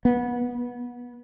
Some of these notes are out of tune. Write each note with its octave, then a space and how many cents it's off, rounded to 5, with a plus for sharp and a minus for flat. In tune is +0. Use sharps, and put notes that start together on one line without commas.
B3 -25